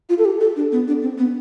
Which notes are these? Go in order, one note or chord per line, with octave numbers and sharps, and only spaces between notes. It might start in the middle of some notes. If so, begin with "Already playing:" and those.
F4
A4
G4
A4
D4
B3
D4
C4
B3